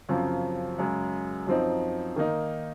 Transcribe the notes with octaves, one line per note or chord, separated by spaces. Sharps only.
F#2 C#3 F3 C4
F#2 C#3 G#3
F#2 F3 C4 D#4
D#3 A#3 D#4